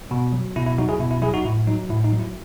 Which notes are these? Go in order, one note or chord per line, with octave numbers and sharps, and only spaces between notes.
B2
F#3
B2 E4
E4
F#3 D#4 F#4
E4 G#4
B2 E4
E4
F#3 E4 G#4
D#4 F#4
A2 E4
F#3 D#4
A2 E4
D#4
F#3
E4